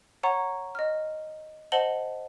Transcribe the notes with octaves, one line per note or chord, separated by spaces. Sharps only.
C#5 F#5 A#5 C#6
D#5 F6
C5 D#5 F#5 A5 F#7 G7